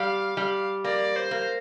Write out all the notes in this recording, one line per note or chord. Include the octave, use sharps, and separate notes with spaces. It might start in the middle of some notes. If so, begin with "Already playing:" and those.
Already playing: G3 F5
G3
A#3 D5
C5
A#3